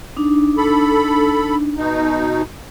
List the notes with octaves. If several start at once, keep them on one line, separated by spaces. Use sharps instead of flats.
D4 D#4
A4 B5
B2 D#4